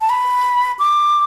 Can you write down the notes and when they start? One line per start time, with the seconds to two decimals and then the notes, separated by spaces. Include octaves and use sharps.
0.01 A5
0.10 B5
0.79 D6